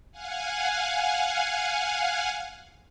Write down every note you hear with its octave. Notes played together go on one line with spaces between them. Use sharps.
F5 F#5 G#5